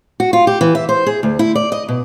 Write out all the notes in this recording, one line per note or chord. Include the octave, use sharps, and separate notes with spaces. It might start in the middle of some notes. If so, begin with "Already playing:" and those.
F#4
F4
G4
E3
E5
C5
G#4
D2
E4
D5
D#5
B2